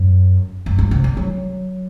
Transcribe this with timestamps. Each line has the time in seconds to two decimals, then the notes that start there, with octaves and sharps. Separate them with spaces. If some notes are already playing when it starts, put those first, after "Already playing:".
Already playing: F#2
0.66 F#2
0.79 G2
0.91 C3
1.04 D3
1.17 F#3